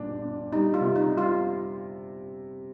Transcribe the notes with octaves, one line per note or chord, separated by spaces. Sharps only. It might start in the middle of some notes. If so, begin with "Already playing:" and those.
Already playing: G1 A#2 D4
D4
G3 D#4
F4
C3
D#4
G3
F4